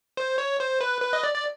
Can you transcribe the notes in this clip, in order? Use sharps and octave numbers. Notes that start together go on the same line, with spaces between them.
C5
C#5
C5
B4
B4
D#5
D5
D5